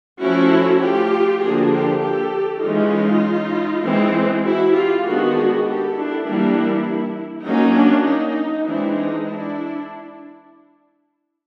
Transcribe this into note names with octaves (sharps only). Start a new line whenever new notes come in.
F3 A3 C#4 E4 F#4
F4 G4
D3 F3 A#3 D4 F#4 G#4
F4 G4
G4 A4
E3 G#3 C#4 D#4 F4
E3 G#3 C4
E4 F#4
F4 G4
D#3 G#3 B3 D4 F#4 G#4
G4 A4
D4 E4
E3 G3 A#3 D4
F#3 A#3 C#4 D#4
D4
D#4
E3 G#3 C4 D4 E4
D#4
D4 E4